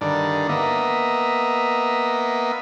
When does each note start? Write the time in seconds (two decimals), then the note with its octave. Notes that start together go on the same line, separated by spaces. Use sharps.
0.01 G2 D3 D#3 D5
0.49 A#3 B3 D#5 E5